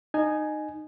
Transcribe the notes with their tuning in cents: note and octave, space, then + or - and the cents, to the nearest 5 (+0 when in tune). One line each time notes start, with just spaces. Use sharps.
D#4 -20 G#5 +10